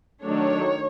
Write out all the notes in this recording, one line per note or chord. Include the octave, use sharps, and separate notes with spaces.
D#3 F#3 A3 D4 C#5